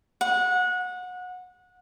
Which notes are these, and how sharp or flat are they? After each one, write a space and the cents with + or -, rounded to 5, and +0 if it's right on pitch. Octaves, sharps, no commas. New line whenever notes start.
F#5 -25